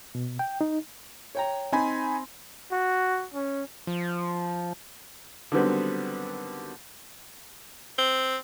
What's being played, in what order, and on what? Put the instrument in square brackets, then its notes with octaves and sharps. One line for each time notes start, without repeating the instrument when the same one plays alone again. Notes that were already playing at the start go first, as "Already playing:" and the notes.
[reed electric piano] B2
G5
D#4
[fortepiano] C#5 G5 A#5
[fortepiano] C4 [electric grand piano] D#4 G#5 B5
[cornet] F#4
C#4
[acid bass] F3
[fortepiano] D3 D#3 F#3 G3 B3 C4
[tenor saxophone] C4